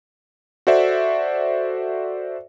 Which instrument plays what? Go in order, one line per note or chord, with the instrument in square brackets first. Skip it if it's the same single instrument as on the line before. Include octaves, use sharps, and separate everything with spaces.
[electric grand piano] F#4 A4 C5 D5 E5